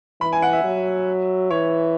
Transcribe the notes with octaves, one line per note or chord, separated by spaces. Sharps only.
E3 B5
G#5
F#5
E5
F#3
E3 C#5